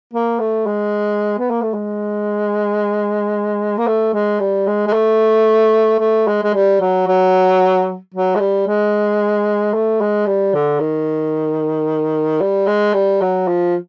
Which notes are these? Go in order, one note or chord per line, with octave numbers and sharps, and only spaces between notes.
A#3
A3
G#3
B3
A#3
A3
G#3
A#3
A3
G#3
G3
G#3
G#3
A3
A3
G#3
G#3
G3
F#3
F#3
F#3
G#3
G3
G#3
A3
G#3
G3
D3
D#3
G3
G#3
G3
F#3
F3